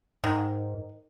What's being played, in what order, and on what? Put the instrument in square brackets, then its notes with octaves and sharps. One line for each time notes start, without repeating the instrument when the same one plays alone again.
[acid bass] G#2 [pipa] D#3